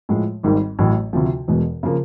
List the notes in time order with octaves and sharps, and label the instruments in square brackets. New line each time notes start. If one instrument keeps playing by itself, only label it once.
[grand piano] A2 F3 G#3
G#1 G#2 D#3 G3
A1 A2 F#3
D2 C3 F3
E1 E2 B2 G#3
C#3 F3 A#3